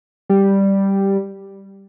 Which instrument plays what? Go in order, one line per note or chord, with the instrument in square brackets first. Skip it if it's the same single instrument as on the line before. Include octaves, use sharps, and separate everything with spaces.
[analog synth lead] G3